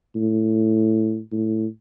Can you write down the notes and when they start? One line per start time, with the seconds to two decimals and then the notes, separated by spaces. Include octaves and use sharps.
0.16 A2
1.32 A2